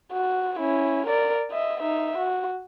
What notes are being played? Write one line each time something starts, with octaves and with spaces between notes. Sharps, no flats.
F#4
C#4 E4
A#4 D5
D#5 E5
D#4 E5
F#4